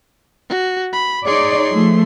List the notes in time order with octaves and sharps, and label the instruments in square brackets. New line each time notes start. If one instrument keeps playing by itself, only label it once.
[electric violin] F#4
B5
[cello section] D#4 C#5 D5 [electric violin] G#4 C6
[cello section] F3 A3